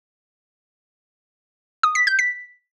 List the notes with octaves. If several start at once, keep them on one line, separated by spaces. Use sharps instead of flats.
D#6
B6
G6
B6